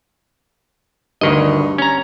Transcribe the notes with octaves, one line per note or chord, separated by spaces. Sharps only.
D2 G2 D#3 D#5
C#4 A#5